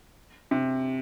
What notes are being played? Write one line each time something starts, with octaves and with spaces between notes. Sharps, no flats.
C3